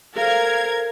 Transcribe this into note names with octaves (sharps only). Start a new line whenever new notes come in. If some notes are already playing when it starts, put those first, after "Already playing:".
A4 A#4 C5 F5 G#6